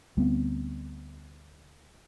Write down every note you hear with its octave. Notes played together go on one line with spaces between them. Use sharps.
D2 G3 B3 C4